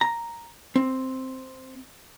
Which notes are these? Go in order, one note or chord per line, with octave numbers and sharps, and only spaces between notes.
A#5
C4